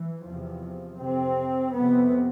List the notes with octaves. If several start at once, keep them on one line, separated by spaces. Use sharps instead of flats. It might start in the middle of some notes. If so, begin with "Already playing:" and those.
Already playing: E3
E2 C3 F3
F2 C3 C4
F2 C3 B3